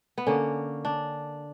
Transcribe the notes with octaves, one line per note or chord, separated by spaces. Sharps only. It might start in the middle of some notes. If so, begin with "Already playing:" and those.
B3
D3 A#3 C#4
D4